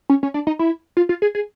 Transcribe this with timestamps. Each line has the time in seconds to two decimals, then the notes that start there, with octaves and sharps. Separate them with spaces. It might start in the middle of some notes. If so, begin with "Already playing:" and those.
0.10 C#4
0.23 C#4
0.34 D4
0.47 D#4
0.59 E4
0.97 F4
1.09 F4
1.22 G#4
1.35 G#4